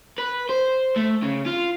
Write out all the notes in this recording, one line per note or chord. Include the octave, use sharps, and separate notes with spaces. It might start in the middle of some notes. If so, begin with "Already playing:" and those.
B4
C5
A3
C#3
F4